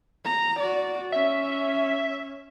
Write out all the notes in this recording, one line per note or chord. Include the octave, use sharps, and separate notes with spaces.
A#5
F#4 D5
C#4 E5